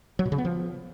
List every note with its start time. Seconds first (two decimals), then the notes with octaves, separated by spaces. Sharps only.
0.19 F#3
0.25 B2
0.32 C#3
0.38 B3
0.45 F3